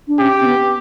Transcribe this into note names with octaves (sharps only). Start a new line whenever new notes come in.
D4
C#4 G4
C4
B3